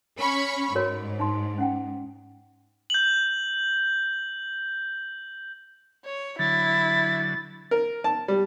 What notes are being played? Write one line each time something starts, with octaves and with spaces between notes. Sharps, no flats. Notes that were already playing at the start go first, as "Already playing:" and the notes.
C#4 B5 C#6
G#2 F#4 A#4 C#5
D#4 C6
C#4 F#5 G5
G6 F#7
C#5
D3 F#3 E4 A6
A#4
A5
G3